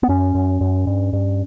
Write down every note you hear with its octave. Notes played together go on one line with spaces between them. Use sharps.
B3
F#2 C#4
F#2
F#2
G2
G2